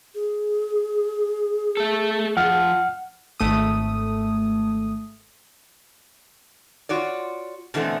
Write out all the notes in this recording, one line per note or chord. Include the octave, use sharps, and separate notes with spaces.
G#4
A3 A4
F3 F#5 F6
G#1 A3 D#6
F4 F#4 C#5 D5
B2 D3 E3 A3 B3 C4